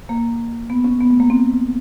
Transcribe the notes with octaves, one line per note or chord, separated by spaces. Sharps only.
A#3
B3
C#4
B3
A3
A#3
C4